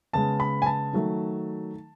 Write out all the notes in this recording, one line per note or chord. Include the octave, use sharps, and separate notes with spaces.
C#3 G#3 B3 A5
B5
G#5
A5
D#3 F#3 A3